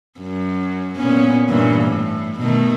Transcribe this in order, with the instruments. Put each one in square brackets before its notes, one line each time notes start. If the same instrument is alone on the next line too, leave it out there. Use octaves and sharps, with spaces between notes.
[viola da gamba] F#2
A#2 B3 C#4
G2 A#2 E3
A2
B2 D#3 A3